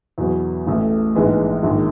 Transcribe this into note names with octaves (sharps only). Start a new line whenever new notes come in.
E2 B2 F#3 B3
A1 A2 E3 A3
A#1 G#2 E3 G#3 B3
A#1 G#2 D#3